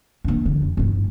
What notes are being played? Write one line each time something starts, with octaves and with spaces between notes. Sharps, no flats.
A#3 D4
D3
F2
G1 A2